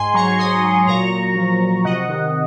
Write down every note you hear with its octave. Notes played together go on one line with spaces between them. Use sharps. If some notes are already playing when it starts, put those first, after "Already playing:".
Already playing: G#2 G#5 C6
F#3 A#5 C#6
G#2 C6 D#6
F#3
A#2 A#5 C#6
A#2
F3
A#2
C3 D#5 F#5
D#3